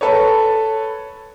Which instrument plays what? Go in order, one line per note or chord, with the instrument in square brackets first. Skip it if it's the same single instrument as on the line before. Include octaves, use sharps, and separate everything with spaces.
[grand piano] A4 B4 C#5